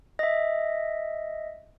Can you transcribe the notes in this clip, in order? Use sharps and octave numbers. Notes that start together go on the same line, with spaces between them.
D#5 E5